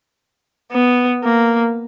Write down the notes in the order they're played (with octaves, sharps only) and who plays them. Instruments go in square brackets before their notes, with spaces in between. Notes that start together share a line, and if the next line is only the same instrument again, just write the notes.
[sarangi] B3
A#3